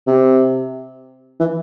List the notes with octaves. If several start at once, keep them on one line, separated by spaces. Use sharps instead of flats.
C3
E3